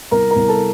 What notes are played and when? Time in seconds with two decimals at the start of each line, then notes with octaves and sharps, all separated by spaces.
0.11 C2 A#4 A#5
0.31 A#4 A#5
0.36 C2
0.49 A4 A5